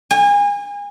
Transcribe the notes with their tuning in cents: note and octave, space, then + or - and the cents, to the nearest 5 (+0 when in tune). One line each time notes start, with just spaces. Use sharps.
G#5 -30